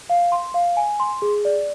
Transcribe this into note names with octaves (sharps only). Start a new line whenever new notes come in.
F5
C6
F5
G#5
C6
G#4
D5